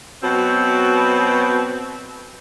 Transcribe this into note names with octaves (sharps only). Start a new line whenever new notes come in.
B2 F#3 C4